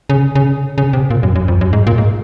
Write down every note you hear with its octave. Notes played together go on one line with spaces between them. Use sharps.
C#3
C#3
C#3
C3
A#2
F#2
F#2
F2
F#2
G#2
A#2
G#2